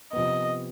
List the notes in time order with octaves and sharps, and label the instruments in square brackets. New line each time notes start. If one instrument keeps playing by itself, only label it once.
[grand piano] C3 F3 B3 [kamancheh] D#5